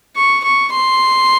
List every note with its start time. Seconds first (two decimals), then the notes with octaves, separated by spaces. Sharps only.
0.16 C#6
0.44 C#6
0.73 C6